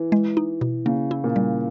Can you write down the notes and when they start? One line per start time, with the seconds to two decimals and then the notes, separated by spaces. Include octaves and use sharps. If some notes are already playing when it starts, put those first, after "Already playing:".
Already playing: E3
0.12 G#3
0.37 D#4
0.61 B2
0.86 C#3 A#3
1.11 E4
1.24 A#2
1.36 G3